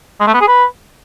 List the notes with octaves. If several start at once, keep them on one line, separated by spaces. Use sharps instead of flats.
G#3
A3
B3
G#4
B4